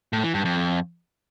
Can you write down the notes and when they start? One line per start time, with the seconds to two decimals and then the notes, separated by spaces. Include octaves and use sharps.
0.13 A2
0.23 E3
0.34 G2
0.45 F2